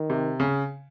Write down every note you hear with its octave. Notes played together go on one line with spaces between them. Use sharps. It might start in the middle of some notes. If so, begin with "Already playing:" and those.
Already playing: D#3
C3
C#3